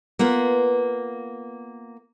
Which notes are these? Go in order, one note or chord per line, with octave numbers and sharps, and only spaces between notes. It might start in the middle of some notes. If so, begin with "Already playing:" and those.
A#3 B3 F4 B4